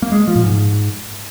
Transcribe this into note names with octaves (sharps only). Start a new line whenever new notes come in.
A#3
G#3
F3
A#2
G#2